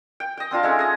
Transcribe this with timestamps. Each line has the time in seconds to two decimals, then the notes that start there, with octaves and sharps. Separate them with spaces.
0.20 G5
0.37 D#5 G5
0.51 C4 D4 F4 A5
0.63 G#3 A3 C#4 D#4
0.79 G#4 D#5